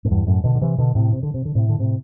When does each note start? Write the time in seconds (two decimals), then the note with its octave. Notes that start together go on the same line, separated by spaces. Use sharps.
0.05 A2
0.11 E2 G2
0.27 F#2 A2
0.44 B2 D3
0.55 D3
0.61 C3 E3
0.78 B2 D3
0.95 A2 C3
1.12 C3
1.23 D3
1.34 C3
1.45 D3
1.55 A2 C3
1.69 D3
1.79 A2 C3